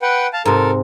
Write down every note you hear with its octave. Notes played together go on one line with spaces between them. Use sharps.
B4 F#5 G5
F5 A5
G#2 C3 A4 A#4